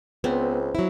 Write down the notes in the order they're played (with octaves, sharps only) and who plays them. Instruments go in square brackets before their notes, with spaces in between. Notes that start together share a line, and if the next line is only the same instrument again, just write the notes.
[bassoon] C#2 [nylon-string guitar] B3 [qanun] C4
[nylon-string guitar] F#3 E4